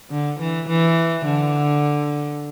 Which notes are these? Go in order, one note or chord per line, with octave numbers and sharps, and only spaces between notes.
D3
E3
E3
D3